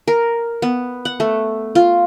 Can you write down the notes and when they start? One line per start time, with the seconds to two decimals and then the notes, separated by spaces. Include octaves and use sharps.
0.08 A#4
0.62 B3
1.05 F#5
1.20 A3
1.75 F4